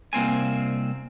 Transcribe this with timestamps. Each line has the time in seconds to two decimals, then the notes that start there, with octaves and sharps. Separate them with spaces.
0.13 C2 A#3 C4 G#5